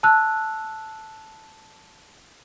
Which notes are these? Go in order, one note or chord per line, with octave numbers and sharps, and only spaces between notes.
A5 E6 F#6